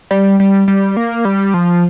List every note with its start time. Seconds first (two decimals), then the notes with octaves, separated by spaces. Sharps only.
0.11 G3
0.40 G3
0.68 G3
0.97 A#3
1.25 G3
1.54 F3